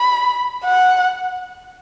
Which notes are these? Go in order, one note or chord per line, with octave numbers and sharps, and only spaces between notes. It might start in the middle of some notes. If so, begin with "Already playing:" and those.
Already playing: B5
F#5